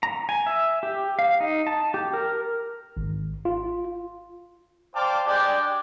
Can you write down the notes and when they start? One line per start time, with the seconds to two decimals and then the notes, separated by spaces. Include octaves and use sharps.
0.03 A#5
0.29 G#5
0.46 E5
0.83 G4
1.19 F5
1.40 D#4
1.67 A5
1.94 G4
2.14 A#4
2.97 G#1
3.45 F4
4.95 C5 D5 F5 G5 A5 D6
5.26 G#3 D4 G4 D5 G5